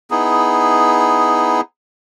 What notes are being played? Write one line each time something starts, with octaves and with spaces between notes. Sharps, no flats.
B3 D#4 E4 G#4